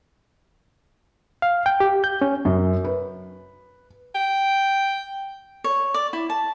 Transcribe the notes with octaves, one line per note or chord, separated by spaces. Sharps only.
F5
G5
G4
G6
C#4
F#2
B4
G5
C#5
D5
E4
A5